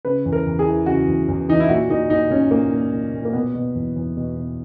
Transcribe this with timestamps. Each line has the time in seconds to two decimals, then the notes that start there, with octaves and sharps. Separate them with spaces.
0.05 C#3 B4
0.26 E2
0.33 A#4
0.46 E2
0.59 G#4
0.66 E3
0.86 C#3 F#4
1.08 E2
1.28 E2
1.49 E3 D#4
1.60 E4
1.69 A#2 F#4
1.90 A#2 D#4
2.10 A#2 D#4
2.30 A#2 C#4
2.51 A#2 A#3
2.73 A#2
2.93 A#2
3.14 A#2
3.25 A#3
3.33 B2 B3
3.55 B2
3.75 E2
3.96 E2
4.17 B2
4.36 B2